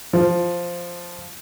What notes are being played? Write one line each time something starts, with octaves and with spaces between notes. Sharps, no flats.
F3